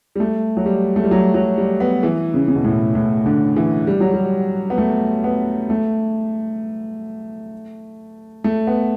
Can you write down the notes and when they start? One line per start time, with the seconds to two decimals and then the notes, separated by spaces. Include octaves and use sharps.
0.16 G3
0.20 A3
0.57 F#3
0.66 G3
0.96 A3
1.04 G3
1.11 F#3
1.34 F#3
1.58 G3
1.80 B3
2.03 E3
2.34 C#3
2.48 C#3
2.56 B2
2.65 A2
2.95 A2
3.26 D3
3.56 E3
3.87 G3
4.00 F#3
4.14 G3
4.70 B3
4.78 A3
5.24 B3
5.70 A3
8.44 A3
8.67 B3